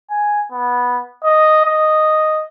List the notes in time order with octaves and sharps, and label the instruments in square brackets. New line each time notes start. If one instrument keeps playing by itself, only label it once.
[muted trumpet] G#5
B3
D#5
D#5